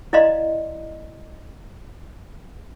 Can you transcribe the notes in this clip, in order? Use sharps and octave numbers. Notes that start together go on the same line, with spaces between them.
E4 D5 D#5 F5 A#5 C6